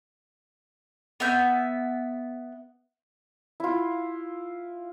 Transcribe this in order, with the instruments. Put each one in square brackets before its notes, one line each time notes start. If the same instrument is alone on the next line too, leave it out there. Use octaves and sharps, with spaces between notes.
[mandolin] B3 E5 G6
[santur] E4 F4